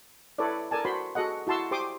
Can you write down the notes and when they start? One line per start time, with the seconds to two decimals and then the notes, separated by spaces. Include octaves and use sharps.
0.38 E4 A4 B4 C#5 D5
0.71 A4 A#4 D5 G#5 A5
0.85 F#4 C5 B5 C6
1.15 F#4 G#4 A4 D#5 F#5
1.47 E4 F#4 A5 C6 E6
1.71 G4 C5 C6 D6 D#6